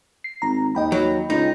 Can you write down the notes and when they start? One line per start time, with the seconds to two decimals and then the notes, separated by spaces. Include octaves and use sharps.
0.24 C7
0.42 G#1 A#5
0.75 D#2 D#5 G5 B5
0.92 F#3
1.30 C#2 D#4